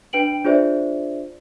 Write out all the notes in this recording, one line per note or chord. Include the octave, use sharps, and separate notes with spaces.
D4 B4 G5 D7 F#7
D4 F4 G#4 C5 D5 E5